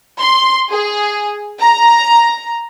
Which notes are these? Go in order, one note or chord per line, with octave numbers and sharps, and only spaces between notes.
C6
G#4
A#5